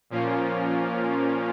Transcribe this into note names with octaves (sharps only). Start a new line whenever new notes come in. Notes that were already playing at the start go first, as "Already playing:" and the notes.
A#2 F3 A#3 C#4 F4